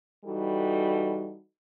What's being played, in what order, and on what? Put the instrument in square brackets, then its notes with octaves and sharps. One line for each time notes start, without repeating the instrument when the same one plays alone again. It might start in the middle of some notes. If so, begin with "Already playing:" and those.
[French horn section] E3 G3 D#4 F#4 A4